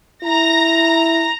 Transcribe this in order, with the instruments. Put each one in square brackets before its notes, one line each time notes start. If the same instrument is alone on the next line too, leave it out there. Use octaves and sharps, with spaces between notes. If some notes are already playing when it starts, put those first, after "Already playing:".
[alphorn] E4 [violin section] A#5 A#6